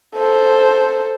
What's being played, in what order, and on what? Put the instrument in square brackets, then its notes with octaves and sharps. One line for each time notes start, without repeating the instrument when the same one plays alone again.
[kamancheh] A4 C5